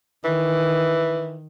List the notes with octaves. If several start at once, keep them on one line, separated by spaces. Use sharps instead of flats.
D#3 E3